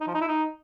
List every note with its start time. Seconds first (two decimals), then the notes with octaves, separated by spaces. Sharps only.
0.01 D#4
0.07 F3
0.14 D#4
0.21 E4
0.28 D#4